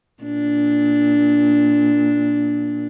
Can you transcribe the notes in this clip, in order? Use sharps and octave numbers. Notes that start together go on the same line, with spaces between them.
A#2 D4